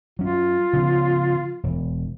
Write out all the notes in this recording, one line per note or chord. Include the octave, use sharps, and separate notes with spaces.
F#3 C#4 F4
C#3 F3 B3
E1